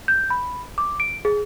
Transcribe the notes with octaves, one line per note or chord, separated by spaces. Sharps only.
G6
B5
D6
D7
G#4